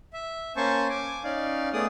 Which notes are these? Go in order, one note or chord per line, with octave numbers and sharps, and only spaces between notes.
E5
A#3 C#4 C5 G#5 A5 C#6
G#5 D6
C#4 D#4 D5 F5
A3 B3 G#4 D5 D#6